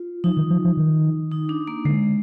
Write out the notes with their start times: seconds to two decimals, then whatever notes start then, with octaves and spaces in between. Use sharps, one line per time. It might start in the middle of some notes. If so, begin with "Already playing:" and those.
Already playing: F4
0.24 F3 D#4
0.37 D#3
0.50 F3
0.65 F3
0.77 D#3
1.31 D#4
1.49 D4
1.67 A#3
1.85 D3 G#3